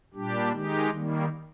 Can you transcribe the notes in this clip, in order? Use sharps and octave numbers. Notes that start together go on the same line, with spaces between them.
A#2 G3 D4 G4
D#3 G#3 D#4 G4
D#3 G3 A#3